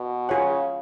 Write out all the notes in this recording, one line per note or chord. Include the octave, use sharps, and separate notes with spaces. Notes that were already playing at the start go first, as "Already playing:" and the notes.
Already playing: B2
C#3 F4 G#4 C#5 F#5